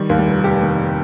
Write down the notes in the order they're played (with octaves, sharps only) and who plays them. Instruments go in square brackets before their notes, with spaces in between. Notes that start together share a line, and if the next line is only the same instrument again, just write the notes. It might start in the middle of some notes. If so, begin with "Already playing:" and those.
Already playing: [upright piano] D#3 G3
D#2
G3
F1
F1 G4
D#3